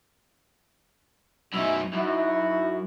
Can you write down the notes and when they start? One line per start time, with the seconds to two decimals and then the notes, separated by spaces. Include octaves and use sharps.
1.53 F#2 B2 C#4 D#4 E4
1.93 F#2 D#4 E4 F#4